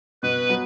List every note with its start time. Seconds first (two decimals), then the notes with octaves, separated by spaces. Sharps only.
0.23 B2 B4
0.49 F#3 B3